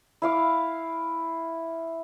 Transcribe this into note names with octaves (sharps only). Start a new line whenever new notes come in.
E4 F5 D6